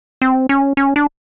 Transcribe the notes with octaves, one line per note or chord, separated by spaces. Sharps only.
C4
C#4
C#4
D4